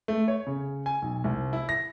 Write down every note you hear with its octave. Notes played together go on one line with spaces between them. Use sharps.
A3
C#5
C#3
G#5
B1
C2
E4
A#6